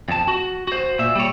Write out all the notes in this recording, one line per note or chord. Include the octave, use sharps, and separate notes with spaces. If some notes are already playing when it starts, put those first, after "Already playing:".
F2 A5
F#4
F#4 C5
A#2 E5
G3 C#5